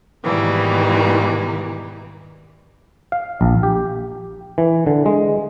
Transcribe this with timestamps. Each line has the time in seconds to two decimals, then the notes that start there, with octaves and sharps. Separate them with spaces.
0.23 G#2 B2 D#3 E3 G3 A#3
3.12 F5
3.41 A#1
3.63 G4
4.58 E3
4.87 D3
5.06 G#3